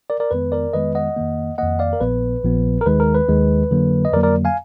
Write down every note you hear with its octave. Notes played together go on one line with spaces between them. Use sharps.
A#4 D5
A#4 D5
F2 D#3 G#3 B3 B4
A#4 D5
F2 D#3 G#3 B3 B4 D#5
D#5 F#5
F2 D#3 A#3
F2 D#3 A#3 D#5 F#5
D5 F5
A#4
A#1 A#2 F3 B3 B4
A#1 A#2 F3 B3
A#4
D#2 D#3 G#3 B4
A#4
B4
D#2 D#3 G#3
F2 D3 F#3 A#3
D#5
F2 D3 F#3 A#3 A#4 D5
A#4 D5
F5 G#5